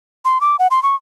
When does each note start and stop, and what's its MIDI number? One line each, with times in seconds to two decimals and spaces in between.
0.25 0.41 84
0.41 0.56 86
0.59 0.67 78
0.71 0.82 84
0.83 0.95 85